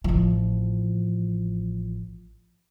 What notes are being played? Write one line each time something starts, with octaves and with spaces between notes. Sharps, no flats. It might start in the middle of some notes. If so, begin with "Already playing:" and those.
A1 F3